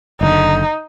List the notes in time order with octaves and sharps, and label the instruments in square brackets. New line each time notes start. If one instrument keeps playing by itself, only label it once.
[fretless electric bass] F#1 A2 D3 [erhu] D#4